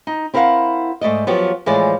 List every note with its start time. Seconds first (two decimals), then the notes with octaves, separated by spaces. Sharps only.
0.07 D#4
0.34 C4 E4 A#4 D5 F5 F#5
1.01 G#2 A3 D5 D#5
1.27 F3 F#3 B3 G4
1.66 A2 E3 F3 G#3 C5 D5